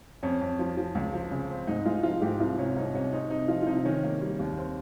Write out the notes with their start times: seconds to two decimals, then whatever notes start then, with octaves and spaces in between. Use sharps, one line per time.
0.23 F2 C#4
0.41 F2
0.59 F3
0.77 F3
0.95 C#2
1.13 F3
1.31 C#3
1.50 C4
1.67 G#2 D#4
1.86 G#3 F4
2.03 F3 F4
2.21 G#2 G4
2.40 C2 F4
2.58 C3 C#4
2.76 C2 D#4
2.94 C2 C#4
3.12 C4 D#4
3.30 C3 D#4
3.48 F3 F4
3.62 F4
3.66 C3 D#4
3.85 D#3 C#4
4.03 A#3
4.21 G3
4.39 D#2
4.57 C4